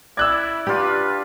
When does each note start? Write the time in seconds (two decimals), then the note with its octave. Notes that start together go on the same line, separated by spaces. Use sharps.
0.17 E4 D5 E6 F#6 G#6
0.67 D4 F4 G4 B4